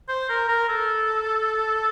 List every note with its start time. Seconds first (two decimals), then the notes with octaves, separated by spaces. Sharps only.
0.08 C5
0.29 A#4
0.49 A#4
0.69 A4